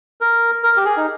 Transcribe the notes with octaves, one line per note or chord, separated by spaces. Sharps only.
A#4
A#4
G4
G#4
D#4